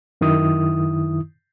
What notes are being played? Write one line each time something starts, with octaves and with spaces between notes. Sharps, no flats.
F#2 D#3 E4 D#6